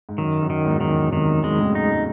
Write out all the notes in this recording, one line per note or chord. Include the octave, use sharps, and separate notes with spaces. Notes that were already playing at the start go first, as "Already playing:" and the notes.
G#2
F#2 D#3
F#2
D#3
E2 G#2
D#3
E2
G#2 C3 D#3
G#3
A2 C#3
D#4